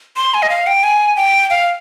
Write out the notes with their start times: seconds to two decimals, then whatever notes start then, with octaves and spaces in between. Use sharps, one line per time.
0.16 C6
0.34 G#5
0.42 D#5
0.50 F5
0.67 G5
0.83 G#5
1.16 G5
1.50 F5